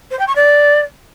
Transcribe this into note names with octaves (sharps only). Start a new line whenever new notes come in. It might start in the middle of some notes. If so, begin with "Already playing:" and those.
C5
G5
C#6
D5